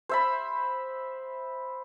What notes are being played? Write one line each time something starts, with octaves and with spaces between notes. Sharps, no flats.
C5 E5 B5